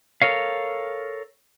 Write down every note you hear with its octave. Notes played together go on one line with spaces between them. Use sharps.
A4 A#4 C#5 F5